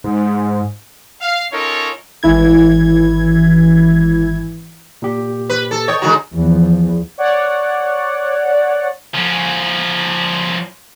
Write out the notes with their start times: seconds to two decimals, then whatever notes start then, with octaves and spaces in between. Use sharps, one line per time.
0.04 G#2
1.21 F5
1.52 C#4 D#4 F4 A4 A#4 C#5
2.23 G#1 E3 E4 G#6
5.02 A#2 G4
5.50 B4
5.71 A4
5.88 C#5 D#5 G5 C#6
6.02 D3 G#3 F#4 A#5
6.34 E2 F3
7.18 C#5 D5 F#5
9.14 F3 C#4